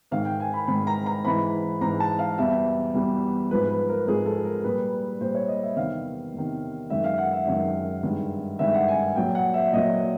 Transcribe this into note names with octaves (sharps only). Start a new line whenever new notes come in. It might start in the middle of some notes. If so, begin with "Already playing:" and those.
G#2 D#3 G#3 F5
G5
G#5
B5
G#2 D#3 G#3 B5
A#5
A#5
G#2 E3 G#3 B5
G#2 E3 G#3 A#5
A5
F5
E2 B2 G3 E5
E2 B2 G3
G#2 F3 G#3 B4
B4
A#4
G#2 F3 G#3 G#4
A4
A#4
A#2 G3 B4
A#2 G3 C5
C#5
D#5
E5
E2 C3 D#3 F5
E2 C3 D#3
F#2 D#3 G#3 E5
F5
F#5
E5
F#2 D#3 G#3
G2 D#3 G#3
G2 D#3 G#3 E5
F#5
G#5
A#2 F#3 G5
F#5
E5
A#2 F#3 D#5